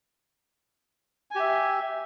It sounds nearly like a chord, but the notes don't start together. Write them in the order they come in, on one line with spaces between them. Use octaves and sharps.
G#5 G4 E5